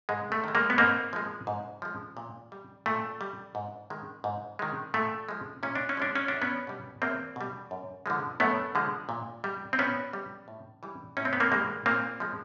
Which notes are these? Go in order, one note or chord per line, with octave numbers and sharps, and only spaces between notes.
G#2 G#3
A3
D#3 G#3
G#3 A#3
B3
G#2 A#3 C4
F3 G#3
G#2
F3 G#3
A#2
G3
A#2 A3
G3
G#2
D#3 G#3
G#2
D#3 G#3
A#2 A3
F3 G#3
A#2 C#4
D4
C#4
F3 G#3 D4
C#4
E2 D4
B3 C#4
B2 G3
E2 A#3 C4
B2 G3
F#2
D3 F3 G#3
F#2 A3 B3
D3 F3 G#3
A#2
G3
C4
A#2 B3 C#4
G3
A2
E3 G3
A2 C#4
C4
B3
A#3 C4
E3 G3 G#3 A#3
A#2 A#3 C4
F3 G#3